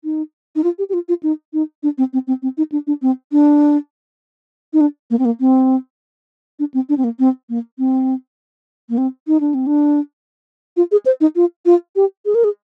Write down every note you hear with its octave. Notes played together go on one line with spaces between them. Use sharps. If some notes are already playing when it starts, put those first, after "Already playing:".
D#4
D#4
F4
G4
G4
F4
F4
D#4
D#4
D4
C4
C4
C4
C4
D#4
D4
D4
C4
D4
D#4
D4
A#3
C4
A#3
C4
D4
C4
D4
C4
A#3
C4
A#3
C4
A#3
C4
D#4
D4
C4
D4
F4
G#4
C5
D#4
F4
F4
G4
G#4
A#4
G#4